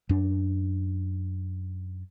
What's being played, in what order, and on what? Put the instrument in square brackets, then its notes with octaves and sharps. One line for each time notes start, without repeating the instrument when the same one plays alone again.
[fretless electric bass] F#2 D4